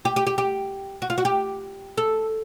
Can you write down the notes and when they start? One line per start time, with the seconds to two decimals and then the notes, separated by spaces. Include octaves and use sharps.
0.05 G4
0.16 G4
0.27 G4
0.38 G4
1.02 F#4
1.10 F4
1.18 F#4
1.25 G4
1.97 A4